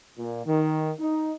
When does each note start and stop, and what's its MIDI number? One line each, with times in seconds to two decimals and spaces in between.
0.18 0.44 46
0.46 0.92 51
0.99 1.33 63